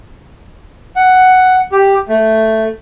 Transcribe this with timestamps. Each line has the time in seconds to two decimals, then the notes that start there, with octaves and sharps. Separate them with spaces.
0.96 F#5
1.72 G4
2.09 A3